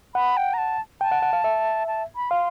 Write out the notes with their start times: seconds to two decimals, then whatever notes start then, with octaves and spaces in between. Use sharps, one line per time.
0.15 F#5 B5
0.37 G5
0.54 A#5
0.58 A5
1.01 G5 A5
1.12 F#5
1.22 F#5
1.33 F5
1.44 E5
1.88 A5
2.16 B5
2.30 F5 C6